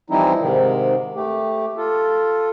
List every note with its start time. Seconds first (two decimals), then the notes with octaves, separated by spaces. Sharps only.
0.10 E3 F3 G3 C4 D#4 E4
0.39 G#2 C3 D#3
1.15 A3 G4
1.77 F4 A4